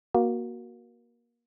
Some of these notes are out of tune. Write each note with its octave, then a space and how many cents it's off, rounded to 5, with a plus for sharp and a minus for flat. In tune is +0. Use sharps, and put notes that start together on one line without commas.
A#3 +20 F#4 +0